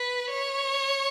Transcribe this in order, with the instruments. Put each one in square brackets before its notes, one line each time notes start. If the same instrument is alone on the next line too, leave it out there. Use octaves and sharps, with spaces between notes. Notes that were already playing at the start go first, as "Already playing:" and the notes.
Already playing: [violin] B4
C#5